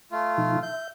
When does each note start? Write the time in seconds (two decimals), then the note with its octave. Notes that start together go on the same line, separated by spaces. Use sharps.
0.12 A3 F4
0.38 B2 F3 D#4
0.63 E5 G6